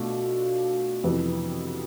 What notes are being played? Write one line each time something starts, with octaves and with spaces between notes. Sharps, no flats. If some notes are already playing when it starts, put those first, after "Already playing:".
Already playing: B2 A3 D4 F4
F2 C3 E3 B3